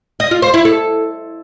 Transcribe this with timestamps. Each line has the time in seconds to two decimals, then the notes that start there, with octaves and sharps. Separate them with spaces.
0.20 D#5
0.31 F4
0.42 C5
0.54 E4
0.65 A4